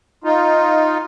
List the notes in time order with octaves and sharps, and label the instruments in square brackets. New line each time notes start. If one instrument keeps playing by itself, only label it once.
[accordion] D#4 F4